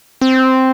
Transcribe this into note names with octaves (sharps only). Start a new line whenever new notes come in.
C4